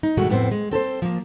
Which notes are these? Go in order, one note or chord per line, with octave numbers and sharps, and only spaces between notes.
D#4
G2 B2 D#3 G#3 A3 F#4
F2 A2 B3 C4 C5
G#3
C4 A4 B4 C5
F3 A#3